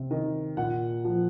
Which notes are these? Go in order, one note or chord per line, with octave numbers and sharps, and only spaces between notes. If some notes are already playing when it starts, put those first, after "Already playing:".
Already playing: C3
D#3
A#2 F#5
F3